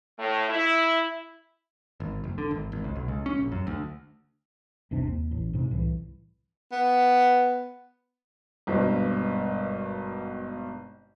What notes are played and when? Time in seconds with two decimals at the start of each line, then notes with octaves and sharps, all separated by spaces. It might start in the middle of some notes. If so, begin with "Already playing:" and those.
0.17 A2
0.48 E4
2.00 G#1
2.24 F#1
2.38 D3
2.51 G#1
2.72 G#1
2.84 C#2
2.96 B1
3.08 C#2
3.26 C#4
3.38 A#1
3.52 F#2
3.67 D2
4.91 G1 D#2 C3 D4
5.07 D#2
5.31 A1
5.53 G#2 C3
5.71 C2 A2 E3
6.72 B3
8.67 G#1 G2 B2